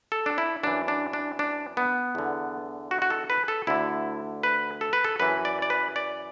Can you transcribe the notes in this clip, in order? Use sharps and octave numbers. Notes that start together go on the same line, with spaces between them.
A4
D4
E4
F#2 E3 D4
D4
D4
D4
B3
E2 D3
F#4
F#4
A4
B4
A4
D2 D3 E4
B4
A4
B4
A4
F#2 E3 B4
D5
D5
B4
D5